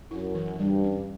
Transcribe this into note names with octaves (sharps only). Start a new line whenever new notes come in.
F#2 E4
E3
G2 G3
C#4